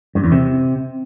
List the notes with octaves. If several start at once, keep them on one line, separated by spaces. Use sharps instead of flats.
G2
E2
C3